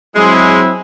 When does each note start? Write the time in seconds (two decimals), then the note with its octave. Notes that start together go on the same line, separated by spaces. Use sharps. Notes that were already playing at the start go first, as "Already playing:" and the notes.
0.16 F#3 G#3 C4 E4